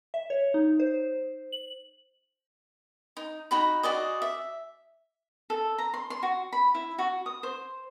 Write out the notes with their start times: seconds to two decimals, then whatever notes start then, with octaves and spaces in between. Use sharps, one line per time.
0.14 E5
0.30 C#5
0.54 D#4
0.80 C5
1.52 F#7
3.17 D#4
3.51 D#4 F#4 B5
3.83 F#4 G#4 D5 D#5
4.22 E5
5.50 A4
5.78 A#5
5.94 C6
6.10 C6
6.23 F#4
6.53 B5
6.75 E4
6.98 F#4
7.26 D#6
7.43 C5